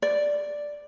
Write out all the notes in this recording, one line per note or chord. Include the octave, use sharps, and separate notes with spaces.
D5